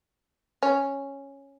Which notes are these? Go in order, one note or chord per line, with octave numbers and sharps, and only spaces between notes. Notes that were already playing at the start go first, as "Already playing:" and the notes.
C#4